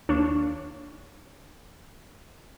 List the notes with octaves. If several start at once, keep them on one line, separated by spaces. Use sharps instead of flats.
D#2 D4 C#5 F5 C#6 E7